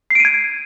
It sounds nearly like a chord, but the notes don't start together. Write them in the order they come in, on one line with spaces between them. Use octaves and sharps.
C7 D7 D#7 G#6